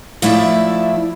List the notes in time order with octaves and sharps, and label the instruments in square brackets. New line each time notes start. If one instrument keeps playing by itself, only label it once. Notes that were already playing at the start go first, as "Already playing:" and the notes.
[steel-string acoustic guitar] F3 A3 E4 D5 E5